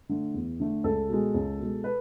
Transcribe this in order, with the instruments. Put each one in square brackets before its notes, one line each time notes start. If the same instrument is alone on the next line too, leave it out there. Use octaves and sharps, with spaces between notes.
[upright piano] D3 A3
E2
D3 A3
C#2 A4
B2 G#3
C#2
B2 G#3
B4